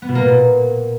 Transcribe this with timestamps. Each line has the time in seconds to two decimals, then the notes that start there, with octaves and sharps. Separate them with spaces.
0.02 B3
0.09 B2
0.15 A#3
0.22 B2
0.28 A#2